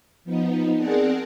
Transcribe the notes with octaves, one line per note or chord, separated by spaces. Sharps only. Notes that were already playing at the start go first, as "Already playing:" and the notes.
F3 B3 D#4
C4 G#4 A#4 D5 F#5 A5